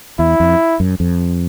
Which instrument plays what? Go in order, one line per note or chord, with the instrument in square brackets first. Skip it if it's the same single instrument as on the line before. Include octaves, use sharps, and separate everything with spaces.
[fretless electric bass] E2 [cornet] E4
[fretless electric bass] F2
F#2
F2